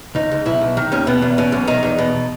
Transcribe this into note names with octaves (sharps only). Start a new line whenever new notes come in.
C#2 D#4
C#2
B1 E4
B1
D#3
D#2 C#4
B2 B3
E2
B2 C#4
B1
D#3 D#4
E2
B2